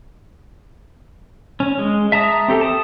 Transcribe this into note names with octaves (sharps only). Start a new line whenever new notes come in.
C#4
G#3
E5 A5 A#5 D#6
C4 G4 A4
A5 D#6